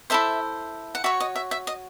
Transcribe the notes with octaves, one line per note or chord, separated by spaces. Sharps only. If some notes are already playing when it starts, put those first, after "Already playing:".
E4 A4 C5 E5
F#5
F#4 C#5 E5
D#5
E5
E5
D#5